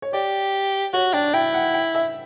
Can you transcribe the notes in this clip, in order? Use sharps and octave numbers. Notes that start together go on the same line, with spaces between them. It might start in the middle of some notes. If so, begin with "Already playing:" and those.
C#5
G4 D5
F#4 C#5
D4 G5
E4 G5
F#5
G5
E5